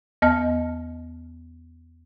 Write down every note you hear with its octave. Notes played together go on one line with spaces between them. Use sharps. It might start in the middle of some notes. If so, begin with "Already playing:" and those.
E2 B3 D#5 A5 F6